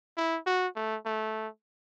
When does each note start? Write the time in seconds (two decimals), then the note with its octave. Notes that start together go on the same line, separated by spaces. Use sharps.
0.17 E4
0.47 F#4
0.76 A3
1.06 A3